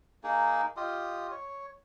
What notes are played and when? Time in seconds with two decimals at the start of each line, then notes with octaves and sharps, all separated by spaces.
0.24 A#3 D#4 G#4
0.77 F4 G4 D#5
1.31 C#5